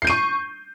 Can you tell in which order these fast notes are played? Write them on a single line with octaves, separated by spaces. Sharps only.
C7 G6 D#7 C#6